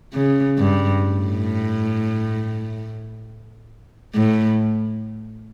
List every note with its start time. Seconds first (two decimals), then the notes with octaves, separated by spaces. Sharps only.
0.14 C#3
0.58 G2
1.02 A2
4.15 A2